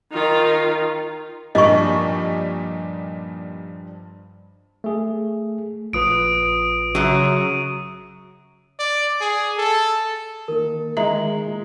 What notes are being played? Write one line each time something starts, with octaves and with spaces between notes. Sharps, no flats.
D#3 F4
G2 A#2 F3 G3 D#4 D#5 C#6
A3 G#4
A#1 F4 B4 D#6 D7
F#2 C#3 F#3 D#7
D5
G#4
A4
D#3 A#3 A#4
D#3 G#3 E5 A#5 F#7
A#2 F4